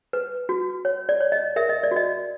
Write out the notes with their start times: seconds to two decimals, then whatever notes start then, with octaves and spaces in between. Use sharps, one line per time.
0.13 B4
0.49 F#4
0.85 C#5
1.09 D5
1.21 C#5
1.32 D#5
1.56 A#4 E5
1.69 D#5
1.83 D5
1.91 F#4 D#5